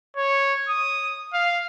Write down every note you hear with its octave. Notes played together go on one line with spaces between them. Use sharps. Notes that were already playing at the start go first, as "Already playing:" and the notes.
C#5
D#6
F5